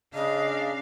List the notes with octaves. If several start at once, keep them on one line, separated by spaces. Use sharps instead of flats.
C#3 D4 D#5 F5